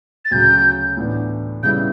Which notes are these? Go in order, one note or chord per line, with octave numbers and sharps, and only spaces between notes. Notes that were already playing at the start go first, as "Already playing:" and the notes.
A6
D2 C#3 F#3 G6
A2 E3 B3 D4
C#3 G3 B3 E4 G6